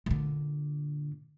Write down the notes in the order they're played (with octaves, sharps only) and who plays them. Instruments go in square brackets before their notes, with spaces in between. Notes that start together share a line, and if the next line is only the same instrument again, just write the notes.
[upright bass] A#2 D3